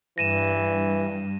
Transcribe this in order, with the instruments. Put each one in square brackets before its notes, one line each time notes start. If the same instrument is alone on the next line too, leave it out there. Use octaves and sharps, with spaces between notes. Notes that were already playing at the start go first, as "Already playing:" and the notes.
[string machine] G2 [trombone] E3 [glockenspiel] A#6 D#7 E7